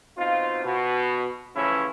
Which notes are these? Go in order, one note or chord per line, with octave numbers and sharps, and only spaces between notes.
B2 C4 D#4 F4
B2
A2 C#3 E3 F3 C#4 E4